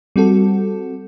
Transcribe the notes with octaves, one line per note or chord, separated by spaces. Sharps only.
G3 C4 F#4 A4